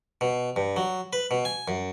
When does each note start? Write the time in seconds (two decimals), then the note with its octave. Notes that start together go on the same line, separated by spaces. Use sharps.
0.21 B2
0.56 G2
0.76 F#3
1.13 B4
1.31 B2
1.45 G#5
1.68 F#2